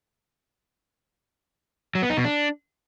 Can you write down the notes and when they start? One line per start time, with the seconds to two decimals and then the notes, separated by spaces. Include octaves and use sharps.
1.95 F#3
2.02 B3
2.10 D#4
2.17 B2
2.24 D4